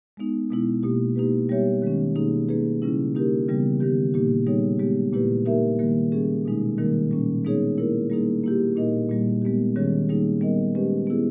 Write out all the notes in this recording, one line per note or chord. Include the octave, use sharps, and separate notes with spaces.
G#3 B3 D#4
B2 G#3 B3 E4
B2 A#3 E4 G4
A#3 D#4 G4 B4
G3 B3 G4 C#5 E5
D#3 G#3 C#4
B2 A#3 D#4 G#4
A#3 D#4 G#4 B4
C#3 G3 C#4 E4
A#3 D#4 G4 A#4
C#3 E3 G3 B3
D#3 G3 B3 G4
A#2 A#3 D#4 G4
G3 B3 D#4 G#4 C#5
G#3 B3 G4
A#2 A#3 E4 G4 B4
A#3 D#4 G4 A#4 E5
D#3 G3 A#3
G3 C#4 G#4
B2 G#3 D#4
D#3 G3 A#3 D#4 A#4
A#2 G3 A#3 C#4
G#3 B3 D#4 G#4 C#5
A#3 E4 A#4
G3 A#3 D#4 G#4
A#3 E4 G4
A#2 A#3 D#4 A#4 D#5
A#2 G3 A#3
G#3 B3 G4
D#3 G3 C#4 G#4 C#5
G3 A#3 D#4 G#4
G3 B3 D#4 A#4 D#5
G#3 C#4 G4 B4 D#5
B3 E4 G#4